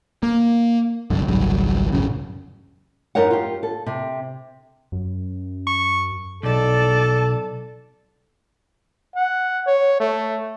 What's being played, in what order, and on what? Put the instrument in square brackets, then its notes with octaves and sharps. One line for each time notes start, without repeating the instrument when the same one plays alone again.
[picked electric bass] A#3
G1 C2 F#2 D3
G#1 C#2 F#3 G3
D1 A1 F#2 C#3
[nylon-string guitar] F#2 D#4 A#4 C#5 F#5
F4 G4
A4
C3
[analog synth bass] F#2
[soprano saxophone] C#6
[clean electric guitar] B1 [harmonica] A4 [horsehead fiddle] D5 A5
[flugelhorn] F#5
C#5
A3